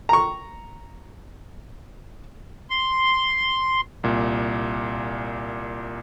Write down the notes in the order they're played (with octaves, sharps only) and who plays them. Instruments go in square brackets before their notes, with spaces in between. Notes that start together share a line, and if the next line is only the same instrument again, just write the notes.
[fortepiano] A#5 C#6
[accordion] C6
[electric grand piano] C2 A#2